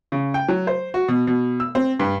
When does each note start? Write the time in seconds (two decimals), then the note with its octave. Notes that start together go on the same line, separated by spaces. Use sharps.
0.12 C#3
0.34 G5
0.48 F#3
0.67 C5
0.94 F#4
1.08 B2
1.27 B2
1.60 E6
1.75 C4
1.99 G2